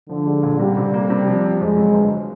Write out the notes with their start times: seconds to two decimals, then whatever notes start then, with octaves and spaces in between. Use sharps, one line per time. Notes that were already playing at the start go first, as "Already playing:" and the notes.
0.09 D3 F3
0.26 G#3
0.43 A#2
0.59 C3 G3
0.77 C3
0.94 A#3
1.10 C3
1.27 F3
1.44 F3
1.61 F2 G#3
1.77 F#3
1.94 G1